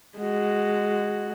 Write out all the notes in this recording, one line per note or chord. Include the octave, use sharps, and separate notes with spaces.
G#3 F#4